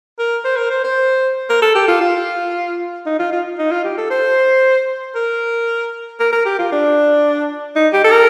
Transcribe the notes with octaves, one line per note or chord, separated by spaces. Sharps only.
A#4
C5
A#4
C5
C5
A#4
A4
G4
F4
F4
D#4
F4
F4
D#4
F4
G4
A4
C5
A#4
A#4
A#4
G4
F4
D4
D#4
G4
A4
A#4